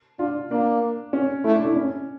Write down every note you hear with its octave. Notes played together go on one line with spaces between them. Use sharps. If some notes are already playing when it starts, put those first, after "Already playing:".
D4 F4
A#3 D4
C#4
A3 E4
D4
E4
C#4